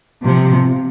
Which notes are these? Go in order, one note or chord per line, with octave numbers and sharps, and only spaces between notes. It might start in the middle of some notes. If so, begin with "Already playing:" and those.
C3 F3